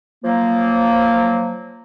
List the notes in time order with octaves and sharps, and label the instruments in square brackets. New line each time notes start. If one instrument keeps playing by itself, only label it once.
[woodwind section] F3 F#3 A#3